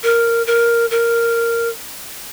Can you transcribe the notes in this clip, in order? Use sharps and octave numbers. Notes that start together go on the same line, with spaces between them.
A#4
A#4
A#4